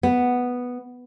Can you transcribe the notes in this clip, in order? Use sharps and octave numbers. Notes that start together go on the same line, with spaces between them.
B3